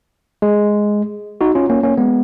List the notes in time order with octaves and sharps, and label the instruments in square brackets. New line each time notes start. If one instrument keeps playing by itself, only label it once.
[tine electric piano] G#3
D#4 F#4
C#4 F4
A#3 C#4
A#3 C#4
G#3 B3